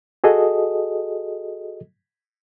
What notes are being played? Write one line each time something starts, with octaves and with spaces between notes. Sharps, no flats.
F#4 G#4 A4 D#5